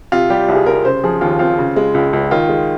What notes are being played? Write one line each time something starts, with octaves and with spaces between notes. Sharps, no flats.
C3 F4
G3 G4
C2
G#4
C2 A#4
C#3 C5
F3 G#4
D#2 F4
C4 F4
C#3
G#3
C#2
C#2
D#3 F4
G#3